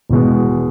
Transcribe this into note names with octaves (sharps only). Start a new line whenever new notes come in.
E1 E2 B2 G#3